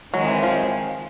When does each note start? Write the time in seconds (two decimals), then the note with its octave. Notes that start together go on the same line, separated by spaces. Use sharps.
0.13 D#3 F#3 G#3 C4
0.28 E3
0.43 F3